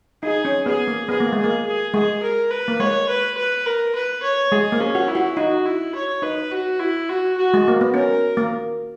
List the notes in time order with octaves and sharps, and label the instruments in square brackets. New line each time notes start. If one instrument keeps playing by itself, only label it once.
[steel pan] D#4 [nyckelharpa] G#4
[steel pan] C#4
[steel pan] B3 [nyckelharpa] G#4
[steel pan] A#3
[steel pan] B3 [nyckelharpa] G#4
[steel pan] A#3
[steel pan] G#3 [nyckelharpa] G#4
[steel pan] A#3
[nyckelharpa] G#4
[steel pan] G#3 [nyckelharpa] G#4
[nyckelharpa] A#4
B4
[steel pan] A#3
[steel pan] G#3 [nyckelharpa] C#5
[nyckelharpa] B4
B4
A#4
B4
C#5
[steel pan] G#3 [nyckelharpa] G#4
[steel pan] A#3
[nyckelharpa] C#4
[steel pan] F#4
[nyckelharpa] E4
[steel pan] F#4
[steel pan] D#4 [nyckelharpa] F#4
[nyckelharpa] E4
C#5
[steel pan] D#4 [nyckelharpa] B4
[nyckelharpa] F#4
E4
F#4
F#4
[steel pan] G#3
A#3
B3
[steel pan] C#4 [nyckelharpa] A#4
[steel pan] A#3